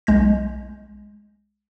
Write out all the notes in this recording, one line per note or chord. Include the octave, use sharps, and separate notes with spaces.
B1 G#3 G6 A#6